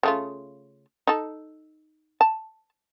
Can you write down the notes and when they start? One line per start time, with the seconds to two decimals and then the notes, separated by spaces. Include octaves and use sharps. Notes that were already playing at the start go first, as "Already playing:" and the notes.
0.03 C#3 A3 F4
1.07 D#4 A4
2.21 A5